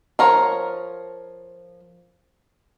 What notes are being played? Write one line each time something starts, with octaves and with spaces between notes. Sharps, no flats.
F3 A#4 C#5